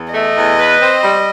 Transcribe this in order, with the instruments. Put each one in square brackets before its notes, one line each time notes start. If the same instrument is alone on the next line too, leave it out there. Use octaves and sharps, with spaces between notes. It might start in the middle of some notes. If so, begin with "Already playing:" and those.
Already playing: [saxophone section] E2
[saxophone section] A3 [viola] D#5
[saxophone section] E2
B4
C4
G3